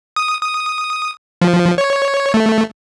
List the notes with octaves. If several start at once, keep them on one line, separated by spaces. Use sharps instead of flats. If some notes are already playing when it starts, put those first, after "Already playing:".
D#6
D#6
F3
C#5
A3